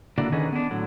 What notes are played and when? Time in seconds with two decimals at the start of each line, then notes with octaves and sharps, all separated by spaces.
0.18 D3 A#3 E4 F#4 A4 D5
0.32 D3 D#3 C#4 D#4 G#4 B4
0.52 B3 D4
0.71 A2 D3 F#3